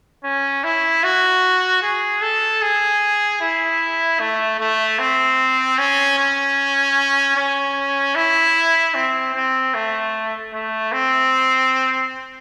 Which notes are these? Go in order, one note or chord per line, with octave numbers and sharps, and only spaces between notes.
C#4
E4
F#4
G#4
A4
G#4
E4
A3
A3
C4
C#4
C#4
C#4
E4
C4
C4
A3
A3
C4